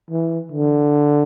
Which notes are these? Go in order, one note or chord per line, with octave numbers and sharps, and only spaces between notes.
E3
D3